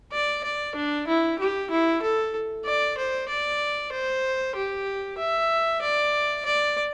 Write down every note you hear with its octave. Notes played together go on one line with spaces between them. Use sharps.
D5
D5
D4
E4
G4
E4
A4
D5
C5
D5
C5
G4
E5
D5
D5